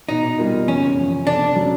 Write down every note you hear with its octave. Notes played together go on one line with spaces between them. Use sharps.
B2 D#4
G3 C4 F4 A#4
F#1 C#4
E2 C3 F3
F1 D4
C#3 F#3